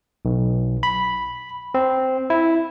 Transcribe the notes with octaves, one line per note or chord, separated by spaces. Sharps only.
B1
B5
C4
E4